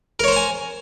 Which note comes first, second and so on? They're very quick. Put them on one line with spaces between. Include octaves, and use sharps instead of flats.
A#4 C#5 C5 A#5 G#5